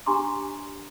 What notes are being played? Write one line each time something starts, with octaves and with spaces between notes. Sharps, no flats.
D4 G4 G#5 A#5 C6 D6